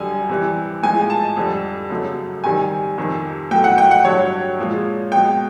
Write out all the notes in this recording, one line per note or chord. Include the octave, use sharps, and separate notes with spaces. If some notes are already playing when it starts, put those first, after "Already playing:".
Already playing: F#2 D3 G3 G#5
C3 E3 G3
A2 F3 G#3 G#5
A5
F2 D3 G3
F#2 C#3 F#3 A3
C3 D#3 G3 G#5
F2 C3 D#3
A2 F#3 A3 G5
F#5
G5
F#5
G2 D3 F#3 C#5
A#2 F3 G#3
B2 G#3 G5